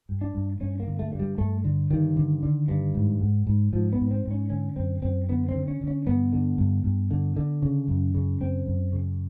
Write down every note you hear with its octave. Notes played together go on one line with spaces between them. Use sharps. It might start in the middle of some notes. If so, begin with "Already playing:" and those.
G2
D4
G2
G2 C#4
A#3
D3
A3
G2
G3
G2 A3
D3
G2 D#3
D3
D3
G2
G#2
G#2
G#2
G#2 F3
B3
G#2
C4
G#2
C#4
D3 C#4
F#2 C4
F#2 C4
D3 B3
C4
D3
C#4
D3
C#4
G2 B3
D3
G2
G2
D3
D3
C#3
F#2
C#3
F#2 C4
F#2
C#3